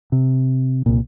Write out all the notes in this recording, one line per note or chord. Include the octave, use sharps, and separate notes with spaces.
C3
C2 A#2